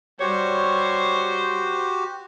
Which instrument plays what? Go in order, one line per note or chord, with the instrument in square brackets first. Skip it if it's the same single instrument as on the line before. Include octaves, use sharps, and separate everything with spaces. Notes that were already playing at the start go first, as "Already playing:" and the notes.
[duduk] G3 [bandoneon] F#4 G4 [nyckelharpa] C5 [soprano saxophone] C#5